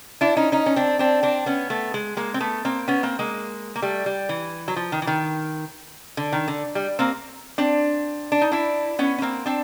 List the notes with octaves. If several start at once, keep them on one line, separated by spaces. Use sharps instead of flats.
D4 E4
C#4 D#4
C#4 D#4
C#4
C4 D4
C4 D4
C4 D4
B3 C#4
A3 B3
G#3
G#3 A#3
C4
A3 B3
A#3 C4
B3 C#4
A#3 C4
G#3 A#3
A#3
G3 A3
G3
E3
F#3
F3
D#3
E3
D#3
D3
D#3
D3
G3
A#3 C4
C4 D4
D4
D#4
D4 E4
B3 C#4
C#4
A#3 C4
C4 D4